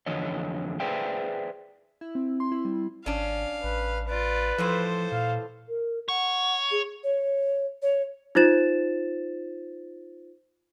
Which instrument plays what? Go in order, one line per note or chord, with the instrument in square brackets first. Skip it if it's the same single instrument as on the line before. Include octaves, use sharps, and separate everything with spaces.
[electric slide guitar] F2 D3 E3 C#5 D#5
G#4 B4 C5 D5 E5 G5
[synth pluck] E4
C4
C6
E4
G3
[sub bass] G#1 [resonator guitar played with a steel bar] C#4 D4 [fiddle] F5
[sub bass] A1 [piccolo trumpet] B4
[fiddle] F4 D5 [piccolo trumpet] B4
[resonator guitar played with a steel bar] A2 E3 F4 [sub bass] F3 [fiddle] A4 C5
[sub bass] A#2 [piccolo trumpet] F5
[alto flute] A#4
[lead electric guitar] C#5 [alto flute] F#5
[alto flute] G#4
[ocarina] C#5
C#5
[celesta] D#4 F4 C5 A6 E7